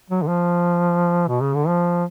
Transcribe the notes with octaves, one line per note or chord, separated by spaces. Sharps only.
F#3
D3
F3
B2
C#3
D3
F3